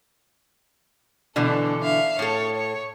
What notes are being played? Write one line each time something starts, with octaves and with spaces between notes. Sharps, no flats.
B2 D3 E3 D4 A4
E5 F5
A2 A4 C#5
C#5